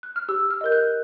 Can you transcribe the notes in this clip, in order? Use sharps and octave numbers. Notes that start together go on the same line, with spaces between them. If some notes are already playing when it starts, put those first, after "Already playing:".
F#6
F6
G4 E6
F6
A#4 D#5 G6
F#6